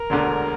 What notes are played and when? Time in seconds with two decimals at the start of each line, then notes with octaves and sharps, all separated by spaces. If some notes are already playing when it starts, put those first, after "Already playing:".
Already playing: A#4
0.10 E1 D2 D3